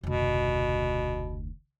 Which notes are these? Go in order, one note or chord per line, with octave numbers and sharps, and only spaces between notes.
F1 D2 B2